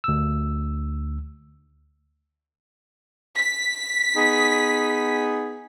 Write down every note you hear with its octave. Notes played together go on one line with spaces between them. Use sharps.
D2 E6
B6
B3 D#4 G#4